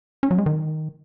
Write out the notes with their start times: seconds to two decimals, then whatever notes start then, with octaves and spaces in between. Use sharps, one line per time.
0.23 C#4
0.31 F#3
0.38 G#3
0.46 D#3